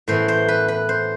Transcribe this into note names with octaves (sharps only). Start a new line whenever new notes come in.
A2 E3 B3 C5
C5
B4
B4
C5